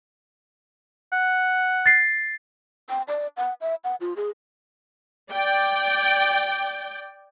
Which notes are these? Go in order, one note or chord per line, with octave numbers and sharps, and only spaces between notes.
F#5
A6 C7
G5
D5
F#5
E5
F#5
F4
G#4
D5 G5